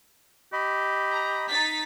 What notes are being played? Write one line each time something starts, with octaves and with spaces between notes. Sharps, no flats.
G4 D#5 B5
A#5
D#4 A6 B6